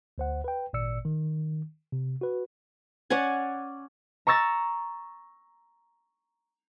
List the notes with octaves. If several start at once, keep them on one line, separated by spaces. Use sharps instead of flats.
D2 C5 F#5
B4 G5
G#1 A#2 D5 E6 C#7
D#3
C3
F#4 B4
C#4 D5 F#5 G#5
A#5 C#6 E6 A6 A#6